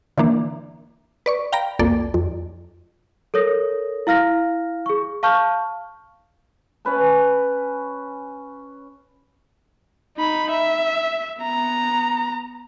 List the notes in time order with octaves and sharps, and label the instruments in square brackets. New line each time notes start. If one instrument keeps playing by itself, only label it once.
[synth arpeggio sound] D3 E3 A#3 D4
B4 D5 C#6
F5 G5 A#5 B5 A#6 D7
C2 F2 A#3 A4 D5
F2
[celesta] A4 A#4 C#5 D#6 A#6
E4 F5 F6 A#6
G#4 C#6
F5 A5 C#6 F6 G6
[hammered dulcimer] C#4 B4 A5
[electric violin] D#4 B5
E5
B3 A#5